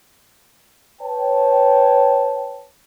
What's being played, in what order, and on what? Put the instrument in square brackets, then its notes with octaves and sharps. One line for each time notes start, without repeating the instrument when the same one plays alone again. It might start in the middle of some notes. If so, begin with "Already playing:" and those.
[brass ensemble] B4 C#5 G5 A5